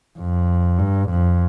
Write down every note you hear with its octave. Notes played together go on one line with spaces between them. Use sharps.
F2
G2
F2